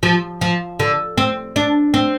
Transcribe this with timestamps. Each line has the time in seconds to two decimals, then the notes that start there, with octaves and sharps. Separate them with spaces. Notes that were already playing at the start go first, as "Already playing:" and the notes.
0.03 F3
0.41 F3
0.79 D3
1.18 C4
1.56 D4
1.94 C4